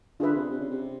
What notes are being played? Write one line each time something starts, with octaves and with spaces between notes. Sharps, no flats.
D3 D4 F4 G#4 B4 E5
C3
C3
C#3
C3